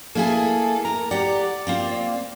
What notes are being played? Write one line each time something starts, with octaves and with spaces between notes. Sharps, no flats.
A#3 E4 G#4 A4
A#4 A#5
G4 D5 F#5
A#3 C4 F4